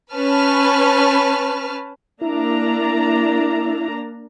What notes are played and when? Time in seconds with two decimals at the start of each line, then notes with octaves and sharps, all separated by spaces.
0.13 C#4 B4 A5 F6
2.21 A#3 D4 E4 A#5